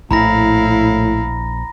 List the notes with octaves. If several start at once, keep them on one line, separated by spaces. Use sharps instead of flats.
A#1 A2 E4 F5 A#5 B5 A#6